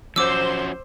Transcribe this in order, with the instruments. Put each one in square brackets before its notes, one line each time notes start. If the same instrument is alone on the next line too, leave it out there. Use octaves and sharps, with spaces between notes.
[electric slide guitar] F3 C#4 F#4 [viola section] C5 [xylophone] D6 E6